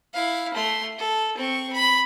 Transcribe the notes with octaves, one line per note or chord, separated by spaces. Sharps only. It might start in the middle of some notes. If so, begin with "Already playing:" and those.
E4 F5
A3 C6
A4
C4 C#6
B5